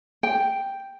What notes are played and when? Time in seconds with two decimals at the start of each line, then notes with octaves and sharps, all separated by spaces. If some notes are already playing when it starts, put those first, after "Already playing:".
0.23 G5